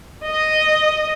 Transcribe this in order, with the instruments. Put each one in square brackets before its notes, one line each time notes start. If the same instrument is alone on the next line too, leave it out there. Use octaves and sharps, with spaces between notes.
[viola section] D#5